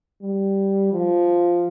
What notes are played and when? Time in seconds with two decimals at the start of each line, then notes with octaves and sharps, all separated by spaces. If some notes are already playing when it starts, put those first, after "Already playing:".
0.22 G3
0.93 F3